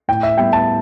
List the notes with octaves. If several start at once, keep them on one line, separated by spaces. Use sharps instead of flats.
A2 G5
E5
G3 B3 E4 G5
A5